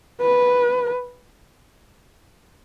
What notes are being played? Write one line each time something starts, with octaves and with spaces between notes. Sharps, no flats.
B4